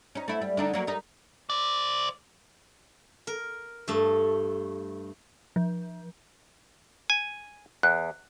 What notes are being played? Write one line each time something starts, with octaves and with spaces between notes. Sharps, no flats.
C#4 D#4
A3 E4
G3
D3 D4 D#4
F#3 A#3
G3 D#4
C5 D5
A#4
G2 A3
F3
G#5
E2 F#6